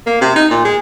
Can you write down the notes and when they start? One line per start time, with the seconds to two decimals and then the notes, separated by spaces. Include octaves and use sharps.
0.07 A#3
0.21 C3
0.36 D#4
0.50 A#2
0.65 G#3